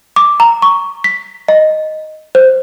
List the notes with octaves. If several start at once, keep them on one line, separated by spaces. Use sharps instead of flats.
D6
A#5
C#6
B6
D#5
C5